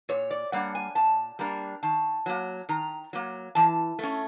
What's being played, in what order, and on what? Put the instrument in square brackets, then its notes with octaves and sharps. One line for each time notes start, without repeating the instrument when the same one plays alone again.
[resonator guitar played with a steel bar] A#2 C#5
D5
G3 A#3 D4 F#5
G#5
A#2 A5
G3 A#3 D4 A#5
D#3 A5
F#3 A#3
D#3 A#5
F#3 A#3
E3 A5
A3 C#4